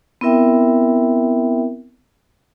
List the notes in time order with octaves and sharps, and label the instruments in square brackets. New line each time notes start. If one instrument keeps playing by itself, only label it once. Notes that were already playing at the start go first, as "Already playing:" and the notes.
[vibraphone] B3 C4 E4 A#4 E5 G5